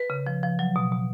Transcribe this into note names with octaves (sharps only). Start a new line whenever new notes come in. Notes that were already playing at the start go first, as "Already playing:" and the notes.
Already playing: B4
C#3
F3
F3
F#3
B2
B2